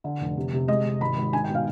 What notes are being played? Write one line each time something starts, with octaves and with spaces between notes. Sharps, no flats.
D3
F1
C3
C3
G#3 D#5
C3
G#1 B5
G#1
D#4 G#5
G5
B2
F5